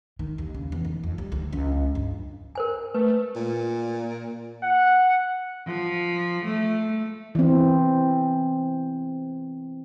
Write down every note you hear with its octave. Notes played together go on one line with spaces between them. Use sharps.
D#3
D#2
C#3
E2
D#3
F2
G3
D2
C#2
G2
A#4 C5 G#5
A3 B4
A#2
F#5
F3
A3
E3 C4